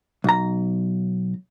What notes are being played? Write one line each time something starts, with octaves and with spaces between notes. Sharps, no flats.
B1 A#5